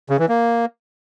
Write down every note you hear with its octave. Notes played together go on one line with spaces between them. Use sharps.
C#3
E3
A#3